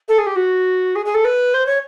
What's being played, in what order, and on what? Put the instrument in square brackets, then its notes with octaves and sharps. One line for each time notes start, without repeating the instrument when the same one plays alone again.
[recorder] A4
G#4
G4
F#4
G#4
G#4
A4
B4
C5
C#5